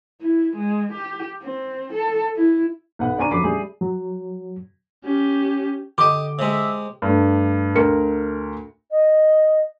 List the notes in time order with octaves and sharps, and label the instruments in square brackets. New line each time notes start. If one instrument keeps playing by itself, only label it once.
[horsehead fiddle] E4
G#3
G4
C4
A4
E4
[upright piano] B1 B3 F#5
D3 D5 G#5 A#5 C#6 D#7
F2 F#3 F#4 B5 D6 C7
G3 G#4 E5
[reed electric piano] F#3
[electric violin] C#4 G4
[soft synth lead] D3 [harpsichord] G4 D#5 [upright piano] D6
[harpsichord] C3 G#3 [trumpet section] E5
[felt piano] G2 A3
D2 A#4 C#7
[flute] D#5